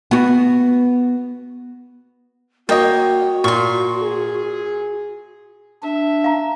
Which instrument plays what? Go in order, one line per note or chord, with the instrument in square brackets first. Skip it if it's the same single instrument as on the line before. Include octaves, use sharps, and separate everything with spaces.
[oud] B3 F#4
[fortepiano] A#3 D#5 [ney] F#4 [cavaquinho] C#5 G5
[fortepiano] A#2 [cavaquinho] C6 C#6
[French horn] G#4
[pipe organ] D4 [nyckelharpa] E5
[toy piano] F5 A#5